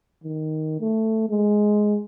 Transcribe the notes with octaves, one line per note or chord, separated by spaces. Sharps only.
D#3
A3
G#3